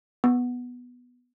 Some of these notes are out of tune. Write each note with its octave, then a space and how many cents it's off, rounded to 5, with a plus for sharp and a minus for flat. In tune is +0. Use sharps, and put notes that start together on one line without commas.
B3 +0